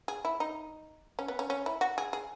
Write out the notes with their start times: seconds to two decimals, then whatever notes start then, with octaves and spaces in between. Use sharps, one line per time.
0.08 G#4
0.25 E4
0.40 D#4
1.19 C#4
1.28 B3
1.39 C#4
1.50 C#4
1.66 E4
1.81 F#4
1.98 G#4
2.13 G#4